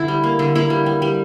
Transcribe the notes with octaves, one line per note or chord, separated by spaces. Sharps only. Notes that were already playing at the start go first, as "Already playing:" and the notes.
Already playing: D3 E4
G3
A#3
D3
A#3 E4
G3
G3
G3